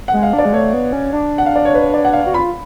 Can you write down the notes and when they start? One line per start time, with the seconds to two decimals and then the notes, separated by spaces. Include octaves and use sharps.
0.08 F#5
0.13 G#3
0.23 F5
0.33 D4
0.38 D5
0.45 G#3
0.53 A3 C#5
0.74 B3
0.93 C#4
1.13 D4
1.38 F#5
1.46 F5
1.56 D5
1.65 C#5
1.74 B4
1.94 D5
2.05 F#5
2.13 F5
2.26 F#4
2.34 F4 B5